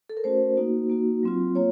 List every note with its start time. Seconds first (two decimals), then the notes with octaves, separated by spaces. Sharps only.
0.09 A4
0.17 A#4
0.24 A3 C#4 F#4 C5
0.57 A#3 D#4 F#4
0.90 A#3 D#4 F#4
1.23 F#3 C4 F4
1.55 A#3 F4 C#5